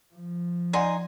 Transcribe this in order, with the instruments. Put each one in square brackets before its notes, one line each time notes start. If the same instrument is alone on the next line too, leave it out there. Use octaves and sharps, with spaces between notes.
[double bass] F3
[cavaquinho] D#4 G#5 C6 [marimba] D5 F#5